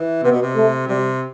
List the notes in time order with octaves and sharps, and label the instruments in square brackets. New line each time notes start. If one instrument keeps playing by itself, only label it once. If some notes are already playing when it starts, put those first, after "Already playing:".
Already playing: [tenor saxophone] E3
[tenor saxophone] C3 [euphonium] B3
[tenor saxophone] B2
C3
[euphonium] A3
[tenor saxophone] C3 [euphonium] G3